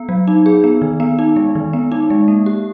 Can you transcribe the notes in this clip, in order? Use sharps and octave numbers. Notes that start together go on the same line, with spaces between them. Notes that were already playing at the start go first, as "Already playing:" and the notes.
Already playing: B3
F#3
D#4
G#4
B3
D#3
B3
D#4
G#3
D#3
B3
D#4
G#3
A#3
G4